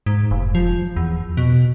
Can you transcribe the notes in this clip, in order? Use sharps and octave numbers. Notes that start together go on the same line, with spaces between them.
G#2
F1
F3
E2
B2